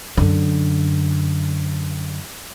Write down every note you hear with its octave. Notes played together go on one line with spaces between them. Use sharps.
F#2 D3